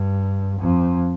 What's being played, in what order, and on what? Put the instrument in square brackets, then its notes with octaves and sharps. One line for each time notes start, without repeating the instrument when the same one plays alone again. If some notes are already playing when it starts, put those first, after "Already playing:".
Already playing: [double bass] G2
F2